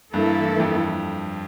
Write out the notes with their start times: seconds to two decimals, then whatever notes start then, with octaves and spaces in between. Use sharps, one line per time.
0.13 G2 E3 A#3 E4 A4
0.60 F2